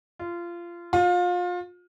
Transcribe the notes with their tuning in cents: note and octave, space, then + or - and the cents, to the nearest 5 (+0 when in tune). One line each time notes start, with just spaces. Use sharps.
F4 -20
F4 +30